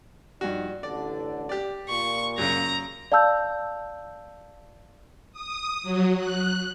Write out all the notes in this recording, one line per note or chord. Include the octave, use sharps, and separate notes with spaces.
G2 F3 D#4 F#4 D5
A1 D3 D5
G4 D5
A#2 C#6
F#2 C#3 A#5
D5 F5 A5 E6 G6
D#6
F#3
F#6